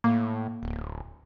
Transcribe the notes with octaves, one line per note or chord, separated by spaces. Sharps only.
A2 A#3
D1